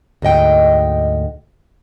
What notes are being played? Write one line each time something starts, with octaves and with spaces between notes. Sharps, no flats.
D2 G#2 D#5 G5